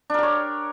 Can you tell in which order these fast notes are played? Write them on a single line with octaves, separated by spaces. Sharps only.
D4 A#4 G4 C#5